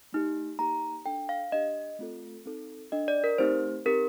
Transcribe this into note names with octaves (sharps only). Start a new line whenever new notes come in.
A3 D#4 G4
A#3 D#4 G4 A#5
D4 A4 G5
F5
D4 G4 D#5
A3 C4 F4 A4
C4 D#4 A4
D4 A4 D#5
D5
A#4
A3 C4 D#4 G4 C5
C4 D#4 G4 A#4